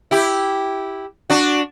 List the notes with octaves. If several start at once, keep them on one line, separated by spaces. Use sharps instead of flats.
E4 G4
D4 F#4